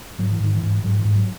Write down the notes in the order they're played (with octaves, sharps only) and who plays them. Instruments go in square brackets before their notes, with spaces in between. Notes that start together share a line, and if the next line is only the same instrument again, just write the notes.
[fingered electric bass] G#2 F#3
E3
G#2 D#3
E3
G#2
G#2 F#3
E3
G#2
F#3